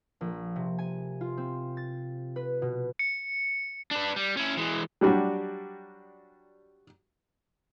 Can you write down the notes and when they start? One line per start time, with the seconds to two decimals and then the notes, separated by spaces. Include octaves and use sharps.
0.21 A#1
0.56 C3
0.78 G#5
1.21 F4
1.37 C4
1.77 A6
2.36 B4
2.62 B2
2.99 C#7
3.91 D4 B4
4.16 G3
4.37 C#4 E4
4.57 E3 G#3
5.01 F#3 G3 D4 F#4 G4